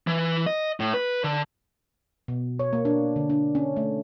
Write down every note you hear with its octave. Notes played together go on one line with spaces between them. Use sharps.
E3
D#5
A2
B4
D3
B2
C#5
A#3
D4
D3
D4
C#4
A3